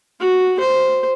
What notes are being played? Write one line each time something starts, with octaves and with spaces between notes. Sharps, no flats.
F#4
C5